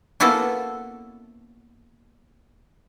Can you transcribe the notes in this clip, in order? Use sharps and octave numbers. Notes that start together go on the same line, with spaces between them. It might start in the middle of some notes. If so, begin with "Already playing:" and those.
A#3 B3 C#4 E4 F#4 A4